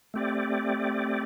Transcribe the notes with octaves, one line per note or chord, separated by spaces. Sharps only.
A3 C4 G4 D5